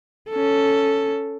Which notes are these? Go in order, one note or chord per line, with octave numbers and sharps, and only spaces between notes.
C#4 A4